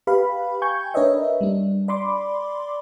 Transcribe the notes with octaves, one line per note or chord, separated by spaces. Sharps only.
G4 B4 F5 B5
G5 G#5 C#6 G6 G#6
D4 A#4 B4 C#5 D#5 E5
G3 D4
D5 B5 C6 D6